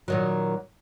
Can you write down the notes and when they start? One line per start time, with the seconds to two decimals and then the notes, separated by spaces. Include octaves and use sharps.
0.08 A#2 D#3 F#3